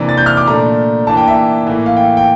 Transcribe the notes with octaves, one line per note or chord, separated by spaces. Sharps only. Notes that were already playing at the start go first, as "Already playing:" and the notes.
Already playing: C3 E3 A#3 D4
A6
G6
F6
D6
A#2 A3 D4 A#5
E3 A#3 D4 A5
G5
E5
A2 E3 A#3
F5
G5
G5